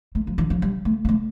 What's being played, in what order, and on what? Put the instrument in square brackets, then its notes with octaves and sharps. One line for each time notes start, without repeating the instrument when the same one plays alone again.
[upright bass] A3
F3
E3
F3
G3
A3
A#3
A3